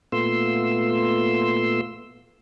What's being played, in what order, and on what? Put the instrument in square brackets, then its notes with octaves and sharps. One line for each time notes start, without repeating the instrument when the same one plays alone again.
[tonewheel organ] A#2 A3 B3 F4 C6 E6